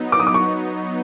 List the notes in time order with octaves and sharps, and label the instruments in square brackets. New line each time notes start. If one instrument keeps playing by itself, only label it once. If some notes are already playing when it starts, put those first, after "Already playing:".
Already playing: [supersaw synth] F#3 B3 D#4
[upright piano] D6
D#6
D6
C#6